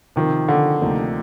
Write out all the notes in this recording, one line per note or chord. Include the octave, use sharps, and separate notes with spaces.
C3 D#3 F3 C4
D3
D2 C3 F3 A#3 D#4